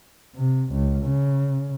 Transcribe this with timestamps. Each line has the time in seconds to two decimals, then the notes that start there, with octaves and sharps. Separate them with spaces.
0.36 C3
0.72 C#2
1.05 C#3